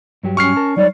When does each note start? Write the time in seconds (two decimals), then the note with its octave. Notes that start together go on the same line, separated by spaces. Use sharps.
0.23 G2 F#3 G4
0.37 C#4 C#6 F6 C7
0.56 A#4 A5
0.77 F#3 G3 D#4 C#5 D5